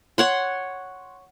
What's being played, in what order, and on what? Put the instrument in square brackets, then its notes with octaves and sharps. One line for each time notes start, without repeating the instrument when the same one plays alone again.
[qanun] C#5 F#5 C6